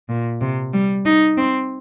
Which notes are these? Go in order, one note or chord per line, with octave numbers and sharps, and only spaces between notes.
A#2
C3
G3
D#4
C4